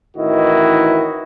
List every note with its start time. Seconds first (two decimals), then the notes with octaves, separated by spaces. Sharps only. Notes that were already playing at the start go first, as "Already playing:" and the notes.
0.17 A1 D#3 E3 E4 F#4 D#5